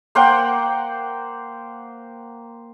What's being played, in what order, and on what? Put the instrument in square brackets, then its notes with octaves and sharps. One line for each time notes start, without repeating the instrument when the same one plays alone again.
[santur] A#3 C5 F#5 G5